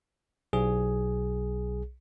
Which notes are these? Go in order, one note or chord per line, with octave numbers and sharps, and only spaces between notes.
B1 G#4